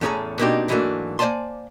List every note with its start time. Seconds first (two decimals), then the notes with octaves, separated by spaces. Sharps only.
0.01 E2 A2 C#4 G#4 A4 A#5
0.39 B2 A#3 C4 D4 D#4 G4
0.68 G#2 E3 F#3 A3 A#3 D4
1.19 A#3 C5 D5 G#5 A5 C6